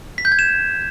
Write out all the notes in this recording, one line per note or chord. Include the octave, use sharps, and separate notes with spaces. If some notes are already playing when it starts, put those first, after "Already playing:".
B6
G6
G#6
E7